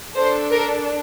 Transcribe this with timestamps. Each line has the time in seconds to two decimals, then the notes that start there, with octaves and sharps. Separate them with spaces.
0.16 D4 A4 C5
0.51 A#4